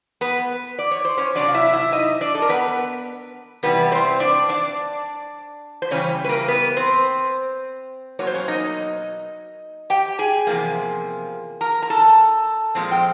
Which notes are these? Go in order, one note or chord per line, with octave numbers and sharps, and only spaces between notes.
B3 B4
D5
C#5
C5
C#4 C#5
C3 D#3 F#3 D4 D5
F5
E4 E5
E4 E5
D#4 D#5
D4 D5
A4
A#4
B3 B4
C3 E3 G3 B3 B4
C4 C5
D4 D5
D4 D5
C5
C#3 E3 G3 C#4 C#5
B4
A#3 A#4
B3 B4
C4 C5
B2 F#3 A#3 C#5
C5
C#4 C#5
D#4 D#5
G4 G5
G#4 G#5
E2 C3 F3 A#3
A#4 A#5
A#5
A4 A5
A#2 F3 G#3 C4
G5